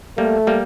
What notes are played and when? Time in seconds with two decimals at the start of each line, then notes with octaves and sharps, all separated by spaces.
0.18 G3 A3 A#3
0.47 G3 A#3